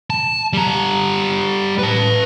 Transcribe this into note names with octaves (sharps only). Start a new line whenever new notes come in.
A5
G3 A#5
B4 A5